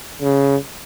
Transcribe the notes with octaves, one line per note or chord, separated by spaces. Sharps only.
C#3